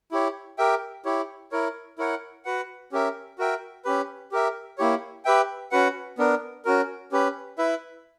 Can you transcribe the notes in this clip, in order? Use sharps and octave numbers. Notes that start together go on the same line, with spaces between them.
E4 G4 C#5
G4 A#4 E5 G5
E4 G4 C#5
E4 A#4 C#5
E4 A#4 C#5 F#5
F#4 B4 F#5
C#4 G4 A#4 E5
F#4 A#4 E5 G5
C#4 G4 B4
G4 A#4 E5
A#3 E4 G4 C#5
G4 B4 E5 G5
C#4 F#4 B4 F#5
B3 D4 A#4
C#4 F#4 A#4
C#4 G4 B4
E4 B4 E5